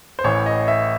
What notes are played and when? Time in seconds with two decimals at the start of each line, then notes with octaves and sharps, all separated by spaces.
0.19 C5
0.24 A1 A2 E3 C#5
0.46 D#5
0.68 E5